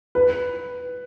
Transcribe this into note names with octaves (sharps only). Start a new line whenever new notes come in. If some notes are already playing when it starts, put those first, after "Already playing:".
B4